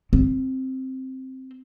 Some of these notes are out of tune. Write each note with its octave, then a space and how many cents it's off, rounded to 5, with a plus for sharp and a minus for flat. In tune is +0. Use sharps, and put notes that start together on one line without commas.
C4 +5